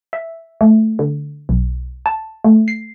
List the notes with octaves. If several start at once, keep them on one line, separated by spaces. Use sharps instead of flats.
E5
A3
D3
B1
A5
A3
C7